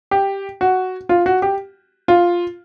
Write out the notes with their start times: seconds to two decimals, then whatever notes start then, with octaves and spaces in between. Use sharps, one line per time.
0.11 G4
0.61 F#4
1.09 F4
1.26 F#4
1.42 G4
2.08 F4